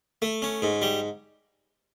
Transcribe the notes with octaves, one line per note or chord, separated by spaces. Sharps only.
A3
C#4
G#2
G3